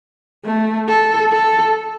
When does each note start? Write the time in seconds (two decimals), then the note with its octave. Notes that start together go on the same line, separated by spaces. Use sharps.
0.45 A3
0.88 A4
1.32 A4